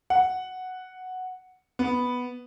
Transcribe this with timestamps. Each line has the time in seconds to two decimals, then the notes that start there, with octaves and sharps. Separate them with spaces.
0.10 F#5
1.79 B3